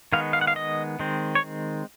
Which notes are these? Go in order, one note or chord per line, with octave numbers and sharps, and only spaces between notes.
D#3 G#3 B3 F5
F5
F#5
F5
D#5
D#3 G#3 C4
C#5